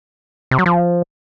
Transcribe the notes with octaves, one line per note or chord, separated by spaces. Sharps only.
C3
F#3
F3